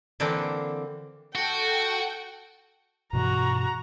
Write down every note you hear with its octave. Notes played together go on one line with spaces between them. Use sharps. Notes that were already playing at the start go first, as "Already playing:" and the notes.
D3 E3 A#3 C4 D4
F#4 A4 G5
G2 B2 E3 F#4 A#5